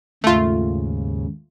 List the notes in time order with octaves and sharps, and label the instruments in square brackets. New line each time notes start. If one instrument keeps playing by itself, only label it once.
[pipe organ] D#2 G#2 C#3 [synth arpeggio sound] A3 F4